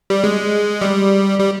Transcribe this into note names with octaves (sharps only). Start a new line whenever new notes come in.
G3
G#3
G3
G3